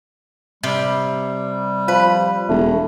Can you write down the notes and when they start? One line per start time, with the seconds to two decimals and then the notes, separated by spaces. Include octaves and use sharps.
0.63 C3 G3
1.88 F3 B4
2.49 E1 A3